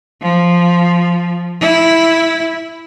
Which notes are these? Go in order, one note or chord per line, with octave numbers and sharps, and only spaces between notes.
F3
E4